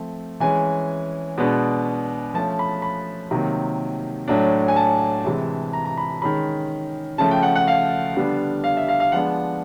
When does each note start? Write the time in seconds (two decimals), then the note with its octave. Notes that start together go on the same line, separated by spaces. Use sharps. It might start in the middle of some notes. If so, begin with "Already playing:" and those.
Already playing: F3 A3 C4
0.40 E3 G#3 C#4 G#5
1.37 B2 G#3 B3 D4
2.34 F3 A3 C#4 A5
2.59 B5
2.82 B5
3.31 C3 D#3 F#3 A#3
4.28 A2 F#3 A3 D4
4.68 G#5
4.76 A5
5.25 C3 E3 G#3
5.73 A#5
5.85 A#5
5.97 B5
6.22 D#3 G#3 C#4 B5
7.18 C#3 F3 A3 A5
7.31 G5
7.43 F#5
7.55 F#5
7.67 F5
8.16 D3 G3 B3 D4
8.64 F5
8.77 E5
8.89 F5
9.00 F5
9.12 F3 G#3 B3 D4 F#5